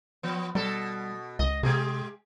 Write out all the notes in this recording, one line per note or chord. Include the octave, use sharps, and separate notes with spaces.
F3 B3
B2 G3 A4
C#2 D#5
C3 G#3 G4 G#4